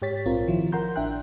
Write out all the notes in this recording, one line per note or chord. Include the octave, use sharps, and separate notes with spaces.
G#2 G4 C#5 A6 B6
A#1 C4 F4 A#4
D#3 F3 E4 F4
A#4 F#5 A#5 C6 G6
A1 D4 E5 G5 F#6